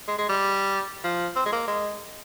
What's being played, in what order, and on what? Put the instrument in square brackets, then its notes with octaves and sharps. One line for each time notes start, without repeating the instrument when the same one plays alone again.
[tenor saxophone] G#3
G#3
G3
F3
C4
G#3
A#3
G#3